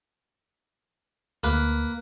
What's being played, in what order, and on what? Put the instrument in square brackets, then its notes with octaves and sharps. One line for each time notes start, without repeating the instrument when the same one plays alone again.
[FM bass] D2 [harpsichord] A#3 B4